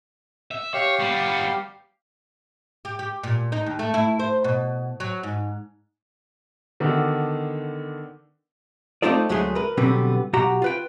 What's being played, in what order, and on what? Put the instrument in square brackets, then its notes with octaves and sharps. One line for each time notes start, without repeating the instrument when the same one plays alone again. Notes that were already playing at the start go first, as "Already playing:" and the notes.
[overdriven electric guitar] E5
[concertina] G4 F5 [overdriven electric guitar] C#5
[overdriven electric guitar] G3 B3
[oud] G4
G4
A#2
D#4
D#2
A3
E4
C5
B2
F#3
G#2
[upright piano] D3 D#3 B3 D4 F#4
[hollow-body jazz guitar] A3 C4 D#4 F4 A4 D5
D2 F#3 G#3 A3 G#4 C6
A#4 B4
B2 D3 F#3 G3 B3 C4
B1 F#4 G4 F#5 A#5
F4 B4 G5